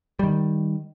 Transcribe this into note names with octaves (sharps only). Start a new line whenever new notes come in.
D#3 G3